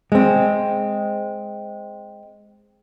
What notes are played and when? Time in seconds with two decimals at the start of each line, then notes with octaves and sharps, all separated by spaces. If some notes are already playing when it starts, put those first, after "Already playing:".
0.12 G#3 C4